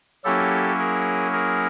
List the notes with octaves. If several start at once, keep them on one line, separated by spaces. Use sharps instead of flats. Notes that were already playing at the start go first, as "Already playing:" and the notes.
F#3 A#3 C#4 E4 G4 A4
G#4 A#4
G#4 A#4